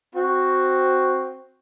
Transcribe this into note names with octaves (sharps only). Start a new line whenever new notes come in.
C4 F#4